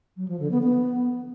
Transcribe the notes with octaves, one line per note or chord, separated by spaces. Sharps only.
F#3
F3
D3
B3
B3